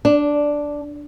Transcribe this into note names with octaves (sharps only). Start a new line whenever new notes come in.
D4